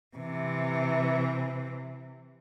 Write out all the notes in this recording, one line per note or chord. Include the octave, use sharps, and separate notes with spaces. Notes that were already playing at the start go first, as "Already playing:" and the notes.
C3 E3